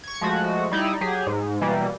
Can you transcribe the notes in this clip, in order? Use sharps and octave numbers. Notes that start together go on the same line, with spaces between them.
C#6 G#6
F3 G#3 A3 F#4
G3 D#4 E4 D5
F#3 G4 G#4
G#2
B2 E3 G3 A#3